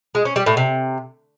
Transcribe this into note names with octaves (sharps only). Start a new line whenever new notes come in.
G#3
C#4
G3
A2
C3